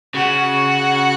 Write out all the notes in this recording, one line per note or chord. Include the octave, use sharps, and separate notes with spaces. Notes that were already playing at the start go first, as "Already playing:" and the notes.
C#3 F#4